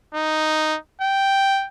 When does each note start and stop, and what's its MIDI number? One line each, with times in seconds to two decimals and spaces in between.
0.15 0.77 63
1.01 1.67 79